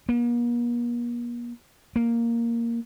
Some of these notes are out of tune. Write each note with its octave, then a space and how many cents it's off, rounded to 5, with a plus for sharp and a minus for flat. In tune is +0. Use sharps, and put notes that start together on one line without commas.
A#3 +45
A#3 +0